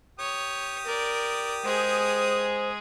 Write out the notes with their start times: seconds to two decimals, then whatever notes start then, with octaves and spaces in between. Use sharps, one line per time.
0.19 G4 C#5 D#6
0.85 A#4 D5
1.64 G#3 G#4 C5